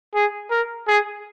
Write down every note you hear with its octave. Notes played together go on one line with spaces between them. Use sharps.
G#4
A#4
G#4